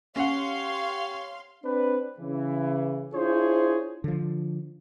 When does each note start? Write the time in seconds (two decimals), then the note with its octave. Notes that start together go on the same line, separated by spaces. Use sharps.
0.16 C#4 G4 C#5 F5 F#5 C6
1.64 C4 D4 B4
2.19 C#3 E3
3.13 D4 E4 F4 G#4 C5 C#5
4.04 D3 F3